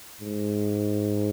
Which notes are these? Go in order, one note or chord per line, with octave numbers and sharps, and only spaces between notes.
G#2